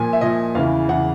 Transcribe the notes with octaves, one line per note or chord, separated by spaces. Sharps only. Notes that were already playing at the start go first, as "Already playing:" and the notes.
Already playing: A#2 F3 G#5
E5
A#2 F3 D#5
E2 C#3 E3 F5
E2 C#3 E3 F#5